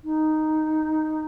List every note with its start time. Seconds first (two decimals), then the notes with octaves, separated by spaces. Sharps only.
0.04 D#4